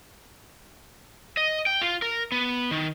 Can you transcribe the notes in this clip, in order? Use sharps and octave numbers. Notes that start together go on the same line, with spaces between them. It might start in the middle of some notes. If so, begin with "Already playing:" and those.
D#5
G5
F4
A#4
B3
D#3